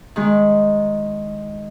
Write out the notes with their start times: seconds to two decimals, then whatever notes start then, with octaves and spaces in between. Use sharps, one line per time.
0.16 D#3 G#3